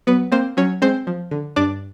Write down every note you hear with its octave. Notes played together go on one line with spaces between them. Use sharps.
F#3 B3 B4
A#3 C4 C5
F#3 C#4 C#5
G#3 C4 C5
F3
D3
G2 D4 D5